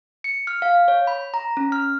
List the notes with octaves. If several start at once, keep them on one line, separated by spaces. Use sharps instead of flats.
C#7
F6
F5
C#5
B5
A#5
C#4
F6